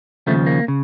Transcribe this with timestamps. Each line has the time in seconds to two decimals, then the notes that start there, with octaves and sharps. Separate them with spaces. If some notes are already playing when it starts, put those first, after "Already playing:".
0.27 D#2 C#3 F3 A3
0.46 A#3
0.68 C#3